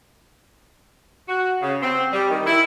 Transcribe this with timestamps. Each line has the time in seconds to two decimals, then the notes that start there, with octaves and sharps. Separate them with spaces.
1.29 F#4
1.61 C#3
1.83 C4
2.13 G3
2.30 D#3
2.47 E4